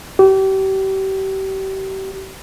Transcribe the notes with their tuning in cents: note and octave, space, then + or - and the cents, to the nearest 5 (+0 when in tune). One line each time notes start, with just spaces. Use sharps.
G4 -35